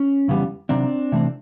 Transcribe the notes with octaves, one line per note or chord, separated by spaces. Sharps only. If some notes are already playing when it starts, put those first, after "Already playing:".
Already playing: C#4
F2 C#3 E3 G3 B3
C3 D#3 F#3 C4 D4
C3 E3 A3 C4